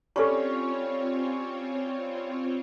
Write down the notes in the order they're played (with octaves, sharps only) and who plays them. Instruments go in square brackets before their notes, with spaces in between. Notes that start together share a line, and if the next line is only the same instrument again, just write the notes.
[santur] G3 C#4 [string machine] C4 F4 C#5 [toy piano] A4 C#6